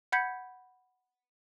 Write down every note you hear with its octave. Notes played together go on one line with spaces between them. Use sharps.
F#5 B5 G6 G#6 B6 C#7